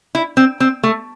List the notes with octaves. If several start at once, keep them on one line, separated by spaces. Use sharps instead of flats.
E4
C4
C4
A3